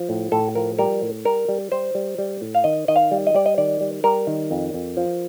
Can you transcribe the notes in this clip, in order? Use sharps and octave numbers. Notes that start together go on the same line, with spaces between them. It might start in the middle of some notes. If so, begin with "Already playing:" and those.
Already playing: F3
A2
A2 A4
F3 A#4
G3 A#4
A2
G3 A#4
G3
G3 C5
G3
G3
A2
F5
D#3 D#5
D#3 D#5
F5
G3
D#5
G3 D5
D#5
D#3 D5
G3
G3 A#4
D#3
F2
F2
F3